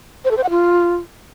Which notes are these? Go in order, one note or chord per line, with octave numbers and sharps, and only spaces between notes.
C5
A4
C5
F#5
F4